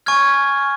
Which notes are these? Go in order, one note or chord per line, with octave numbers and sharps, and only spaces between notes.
G#5 C#6 F6 G#6